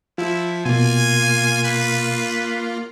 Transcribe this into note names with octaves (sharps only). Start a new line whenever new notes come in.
F3 E4 F4 E5
B2 A#3 F4 G#5
B4